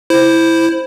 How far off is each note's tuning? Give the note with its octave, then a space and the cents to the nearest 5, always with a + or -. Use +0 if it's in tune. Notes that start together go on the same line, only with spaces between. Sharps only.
E4 +0 C5 +0